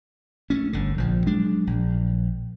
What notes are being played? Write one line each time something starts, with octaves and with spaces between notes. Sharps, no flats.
A3 C4 C#4
G1 D3
A#1 F3
F#3 G#3 D4
A#1